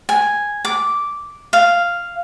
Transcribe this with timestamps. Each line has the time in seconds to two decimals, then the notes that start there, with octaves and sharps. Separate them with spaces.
0.09 G#5
0.65 D6
1.53 F5